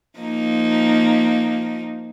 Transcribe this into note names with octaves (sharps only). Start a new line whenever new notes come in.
F3 A#3 D#4